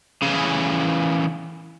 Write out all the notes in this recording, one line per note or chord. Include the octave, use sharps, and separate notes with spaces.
C#3 E3